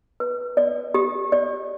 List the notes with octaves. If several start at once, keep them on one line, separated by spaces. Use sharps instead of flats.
B4
D5
G4
D5